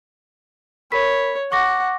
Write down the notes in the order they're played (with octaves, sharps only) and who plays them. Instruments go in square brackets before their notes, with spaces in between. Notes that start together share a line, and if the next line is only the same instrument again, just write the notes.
[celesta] A#4 B5 B6 [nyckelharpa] C#5
[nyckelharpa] F#5 [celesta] C#6 D6 A#6